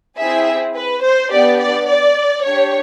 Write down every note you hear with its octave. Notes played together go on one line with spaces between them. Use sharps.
C4 E4 G#4 E5
B4
C5
B3 D4 G4 D5
D5
D5
D4 G4 C#5